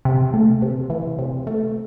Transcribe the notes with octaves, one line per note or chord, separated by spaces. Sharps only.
C3
A3
C3
E3
C3
A3